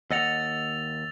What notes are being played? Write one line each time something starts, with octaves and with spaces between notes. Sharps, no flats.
D#2 D#5 F#5 E6 A6 F7